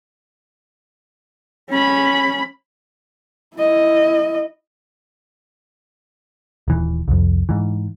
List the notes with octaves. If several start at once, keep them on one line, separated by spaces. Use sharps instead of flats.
C#4 B5
E4 D#5
D#1 E3
C2 F2
G#2 E3